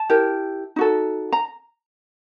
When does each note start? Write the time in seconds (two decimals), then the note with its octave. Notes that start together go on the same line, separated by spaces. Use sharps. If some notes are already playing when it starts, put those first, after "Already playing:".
Already playing: A5
0.10 E4 G4 A#4
0.76 D#4 F#4 A4
1.33 A#5